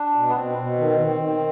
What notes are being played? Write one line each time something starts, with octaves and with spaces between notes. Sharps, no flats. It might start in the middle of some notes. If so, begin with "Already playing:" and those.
Already playing: D4
B2
B3
B2 C4
B2
D#3
D#3
D#3